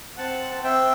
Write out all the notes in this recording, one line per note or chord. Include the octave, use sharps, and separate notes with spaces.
C4 F#5 A5
C4 E5 G5